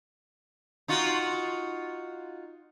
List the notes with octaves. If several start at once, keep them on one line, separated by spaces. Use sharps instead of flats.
D#4 F4 F#4